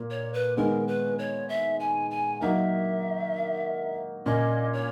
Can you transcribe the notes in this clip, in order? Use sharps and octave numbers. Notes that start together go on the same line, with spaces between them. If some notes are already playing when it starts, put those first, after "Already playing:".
Already playing: A#2 A#3
C#5
B4
D#3 G#3 B3 A#4
B4
C#5
E5
G#5
G#5
F#3 A#3 D#4 A#4 E5
A#2 A#3 C#4 D#5
C#5